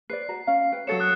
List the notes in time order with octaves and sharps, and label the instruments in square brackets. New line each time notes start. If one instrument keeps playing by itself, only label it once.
[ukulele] B4 C5 D5 [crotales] C7
[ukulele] F#4 A#5
C#4 C#5 F5
B4 G5
[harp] F#3 A4 C#5 [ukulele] B4 [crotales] A6 C#7 E7
[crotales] D#6 F#6 C#7